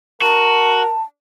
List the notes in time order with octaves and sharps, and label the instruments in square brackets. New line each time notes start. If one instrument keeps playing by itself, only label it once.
[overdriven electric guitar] F#4 [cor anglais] A#4 [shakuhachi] A5